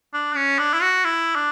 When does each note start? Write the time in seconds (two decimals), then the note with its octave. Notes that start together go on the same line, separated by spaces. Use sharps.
0.14 D4
0.36 C#4
0.59 D4
0.74 E4
0.82 F#4
1.05 E4
1.36 D4